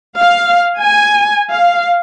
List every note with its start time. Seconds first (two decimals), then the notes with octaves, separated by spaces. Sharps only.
0.16 F5
0.79 G#5
1.49 F5